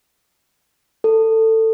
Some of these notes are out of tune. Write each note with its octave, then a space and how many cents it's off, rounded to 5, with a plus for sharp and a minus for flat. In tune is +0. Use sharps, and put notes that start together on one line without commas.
A4 +20